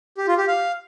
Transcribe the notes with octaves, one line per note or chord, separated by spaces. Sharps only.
G4
F4
G4
F5